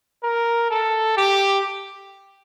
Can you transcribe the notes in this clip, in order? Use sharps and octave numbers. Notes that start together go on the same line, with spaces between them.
A#4
A4
G4